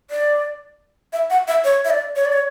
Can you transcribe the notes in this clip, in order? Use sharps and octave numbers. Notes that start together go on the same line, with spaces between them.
D5
E5
F#5
E5
C#5
E5
D5
C#5
D5
C#5